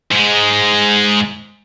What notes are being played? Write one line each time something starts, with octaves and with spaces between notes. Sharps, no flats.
G#2 G#3